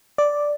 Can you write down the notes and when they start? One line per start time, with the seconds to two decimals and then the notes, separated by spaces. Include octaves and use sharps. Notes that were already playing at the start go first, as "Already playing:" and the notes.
0.18 D5